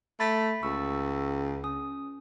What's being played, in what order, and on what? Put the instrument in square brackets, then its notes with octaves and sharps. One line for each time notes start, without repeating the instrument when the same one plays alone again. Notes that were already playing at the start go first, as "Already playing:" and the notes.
[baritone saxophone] A3 [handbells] B5 A6 B6
[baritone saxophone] C#2 [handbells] C#6 E6
[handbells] C#4 D#6